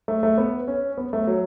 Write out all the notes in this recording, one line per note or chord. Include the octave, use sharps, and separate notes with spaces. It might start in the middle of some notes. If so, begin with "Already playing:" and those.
A3
A3
B3
C#4
B3
A3
F#3